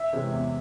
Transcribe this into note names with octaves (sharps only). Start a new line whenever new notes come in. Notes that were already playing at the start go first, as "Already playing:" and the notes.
Already playing: E5
C3 E3 G#3 C#4
E2